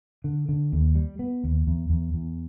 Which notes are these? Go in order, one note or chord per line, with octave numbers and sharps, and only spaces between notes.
D3
D3
D#2
G3
B3
D#2
E2
E2
E2